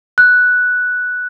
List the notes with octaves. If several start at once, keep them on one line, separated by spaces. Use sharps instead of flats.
F#6